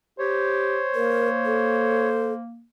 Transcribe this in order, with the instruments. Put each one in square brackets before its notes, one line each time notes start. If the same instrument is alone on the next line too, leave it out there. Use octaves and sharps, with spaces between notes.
[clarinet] G4 [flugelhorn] C5 [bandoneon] C#5
[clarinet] A#3 [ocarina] A#4
[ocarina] A4